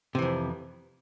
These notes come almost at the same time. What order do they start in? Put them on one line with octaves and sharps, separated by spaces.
C3 E3 F2